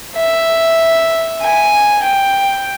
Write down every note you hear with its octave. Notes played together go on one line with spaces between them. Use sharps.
E5
G#5
G5